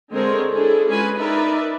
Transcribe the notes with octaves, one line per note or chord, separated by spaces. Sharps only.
D3 G#3 C4 A#4 C5 C#5
D4 E4 G#4 A4
G#3 C#4 F4 G#4 B4 G#5
D#4 A#4 B4 D5 E5